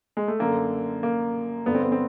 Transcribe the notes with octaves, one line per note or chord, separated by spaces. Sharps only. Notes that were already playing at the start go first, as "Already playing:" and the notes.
G#3
A3
F#2 D3 A#3
A#3
G2 D3 B3
C4
B3
C4